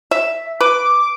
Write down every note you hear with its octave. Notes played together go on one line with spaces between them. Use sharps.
E5
B4 D6